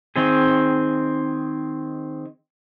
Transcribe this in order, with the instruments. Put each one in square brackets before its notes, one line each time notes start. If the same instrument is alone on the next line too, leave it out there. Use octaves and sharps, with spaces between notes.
[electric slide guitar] D#3 C4 G#4